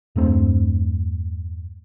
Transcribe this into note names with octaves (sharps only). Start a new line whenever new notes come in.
E2 G2 A3 C4